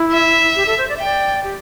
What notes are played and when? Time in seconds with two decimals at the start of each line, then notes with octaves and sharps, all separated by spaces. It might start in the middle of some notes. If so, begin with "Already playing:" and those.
Already playing: E4
0.12 E5
0.56 G4
0.66 A4
0.78 C5
0.89 D5
0.97 E5
1.00 G5
1.05 D5
1.44 G4